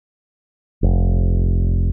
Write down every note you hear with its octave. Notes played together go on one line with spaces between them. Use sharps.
F1